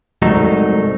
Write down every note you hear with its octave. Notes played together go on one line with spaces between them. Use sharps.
C2 G#2 F#3 A3 D#4